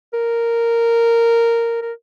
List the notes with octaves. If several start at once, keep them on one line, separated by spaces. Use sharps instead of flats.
A#4
A#4